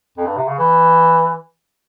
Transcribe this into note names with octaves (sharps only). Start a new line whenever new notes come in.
F2
G2
C3
C#3
E3